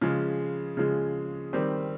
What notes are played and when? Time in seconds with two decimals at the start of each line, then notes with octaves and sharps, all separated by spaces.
0.01 C#3 F3 G#3
0.77 C#3 F3 G#3
1.53 D#3 G3 C4